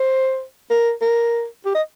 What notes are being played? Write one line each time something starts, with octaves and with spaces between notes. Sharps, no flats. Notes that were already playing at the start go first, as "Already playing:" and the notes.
Already playing: C5
A#4
A#4
G4
D#5